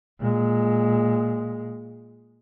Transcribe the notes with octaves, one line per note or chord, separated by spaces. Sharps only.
A#2 G#3